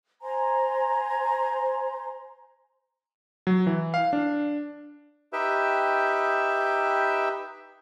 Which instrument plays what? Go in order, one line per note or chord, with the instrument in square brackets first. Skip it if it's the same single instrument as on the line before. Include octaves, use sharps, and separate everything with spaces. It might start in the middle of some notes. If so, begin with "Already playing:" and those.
[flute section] C5 G#5 A#5 C6
[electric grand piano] F#3
E3
F5
D4
[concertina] D#4 G4 B4 E5 G5